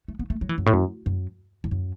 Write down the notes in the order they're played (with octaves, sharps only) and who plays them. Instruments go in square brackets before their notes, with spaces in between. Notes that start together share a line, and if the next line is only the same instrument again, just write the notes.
[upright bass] A3
B3
A3
F#3
E3
F#2
A2
F#2
F#2
E2
F#2